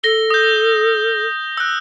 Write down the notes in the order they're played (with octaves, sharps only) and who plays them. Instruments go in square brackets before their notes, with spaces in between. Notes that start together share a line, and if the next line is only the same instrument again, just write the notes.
[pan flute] A4 [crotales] A#6 G7
[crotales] D#6 G6
E6 F#6